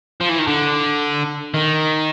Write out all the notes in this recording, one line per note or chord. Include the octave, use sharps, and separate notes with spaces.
F3
E3
D#3
D3
D#3